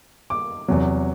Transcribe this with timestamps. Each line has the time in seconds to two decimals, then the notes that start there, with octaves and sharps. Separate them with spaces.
0.30 D6
0.68 E2 C3 F#3